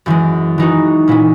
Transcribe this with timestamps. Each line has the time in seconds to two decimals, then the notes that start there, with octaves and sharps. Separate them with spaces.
0.06 F#2 E3 G#3
0.58 E3 G#3 D#4 F#4
1.08 A#2 G#3 C#4 E4